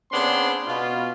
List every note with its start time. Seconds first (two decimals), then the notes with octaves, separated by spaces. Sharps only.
0.12 C#3 B3 C4 D4 C#5 C6
0.67 B2 F4